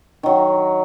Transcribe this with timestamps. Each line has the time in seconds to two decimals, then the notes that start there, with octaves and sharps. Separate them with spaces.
0.23 D#3 F#3